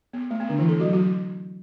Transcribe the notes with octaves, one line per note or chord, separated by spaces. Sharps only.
B3
A3
B3
D3 D4
E3 E4
A3 A4
F#3 F#4
F#3 F#4